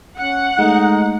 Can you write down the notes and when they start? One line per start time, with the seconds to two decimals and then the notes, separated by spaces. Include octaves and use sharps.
0.19 C#4 F#5
0.59 G#3 A3 D#4